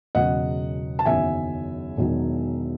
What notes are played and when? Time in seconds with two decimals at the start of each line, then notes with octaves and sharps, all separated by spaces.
0.15 E1 E2 C#3 F#3 D#5 F#5
0.99 A5
1.05 F#1 E2 D#3 F#3 E5 G#5
1.97 E1 E2 D#3 F#3